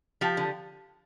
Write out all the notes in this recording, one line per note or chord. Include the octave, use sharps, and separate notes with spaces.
F3 G4
D3